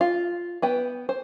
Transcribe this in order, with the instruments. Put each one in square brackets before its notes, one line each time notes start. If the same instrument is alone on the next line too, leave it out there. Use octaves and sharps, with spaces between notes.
[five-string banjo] F4
B3 B4 G5
C5